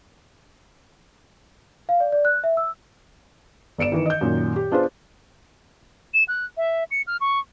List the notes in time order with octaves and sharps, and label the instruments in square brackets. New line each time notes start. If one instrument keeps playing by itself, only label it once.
[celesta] F5
D5
D5
F#6
E5
E6
[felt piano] G1 D5 C#7 D7 E7
D#3 E3
D#5 G6
F#2 A#2 D#3
G4
B3 D4 F4 G#4 B4 C5
[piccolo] E7
F#6
E5
C#7
F6
C#6